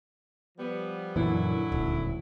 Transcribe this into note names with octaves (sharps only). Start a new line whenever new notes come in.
F3 G3 B3
F#2 A#2 D3 E3 F#3 E4
D#1 D2